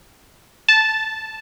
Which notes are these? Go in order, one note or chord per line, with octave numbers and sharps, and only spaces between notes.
A5